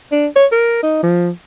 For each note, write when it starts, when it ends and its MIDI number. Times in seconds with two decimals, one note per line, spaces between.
0.12 0.27 62
0.36 0.46 73
0.52 0.79 70
0.83 1.00 63
1.03 1.30 53